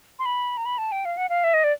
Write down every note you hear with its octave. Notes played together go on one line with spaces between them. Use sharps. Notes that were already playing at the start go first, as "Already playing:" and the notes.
C6
B5
A#5
B5
A5
G5
F5
F#5
F5
E5
D#5
D5